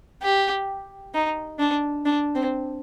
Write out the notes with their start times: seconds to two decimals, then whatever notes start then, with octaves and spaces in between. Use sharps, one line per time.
0.23 G4
1.14 D#4
1.59 D4
2.05 D4
2.35 C4